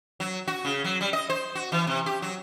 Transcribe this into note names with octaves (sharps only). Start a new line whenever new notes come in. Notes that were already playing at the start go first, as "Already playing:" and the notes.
F#3
F#4
C#3
F#3
G3
D#5
C5
F#4
E3
C3
G4
F#3